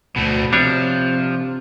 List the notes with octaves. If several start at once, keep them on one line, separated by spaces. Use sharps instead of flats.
D2 B2 A3
C3 F3 G3 D4 C#5